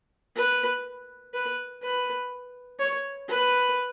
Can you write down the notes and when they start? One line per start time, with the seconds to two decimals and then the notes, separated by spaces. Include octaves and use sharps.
0.36 B4
1.34 B4
1.83 B4
2.80 C#5
3.28 B4